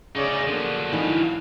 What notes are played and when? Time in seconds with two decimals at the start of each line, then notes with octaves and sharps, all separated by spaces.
0.15 D2 C#3 D#4 C#5 D5
0.47 D3 F3 F#3 A#3
0.93 E3 D#4 F5